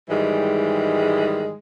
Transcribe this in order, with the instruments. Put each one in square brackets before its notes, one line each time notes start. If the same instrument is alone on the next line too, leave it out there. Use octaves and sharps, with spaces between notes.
[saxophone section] G#2 D#3 E3 G3 G#3